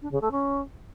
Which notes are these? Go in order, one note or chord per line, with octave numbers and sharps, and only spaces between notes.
D4
C#3
A3
C#4